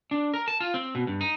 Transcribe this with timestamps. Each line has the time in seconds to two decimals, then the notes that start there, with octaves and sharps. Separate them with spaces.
0.11 D4
0.34 A#4
0.48 A5
0.60 F4
0.74 C4
0.95 B2
1.07 G2
1.21 D#4